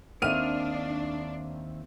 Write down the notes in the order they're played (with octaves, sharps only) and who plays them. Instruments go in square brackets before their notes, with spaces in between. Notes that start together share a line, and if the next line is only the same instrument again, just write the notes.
[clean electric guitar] D#2 A#3 [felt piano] D#3 C4 E5 [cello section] D4 [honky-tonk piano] F6 D#7